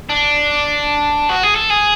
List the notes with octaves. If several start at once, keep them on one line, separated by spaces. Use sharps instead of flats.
D4
F#4
G#4
A4
G#4